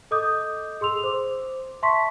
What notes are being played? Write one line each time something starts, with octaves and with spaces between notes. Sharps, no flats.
A4 D#5 D6 D#6 G6
G#4 C6 E6 F7
C5 D6
E5 A5 C6 C#6 B6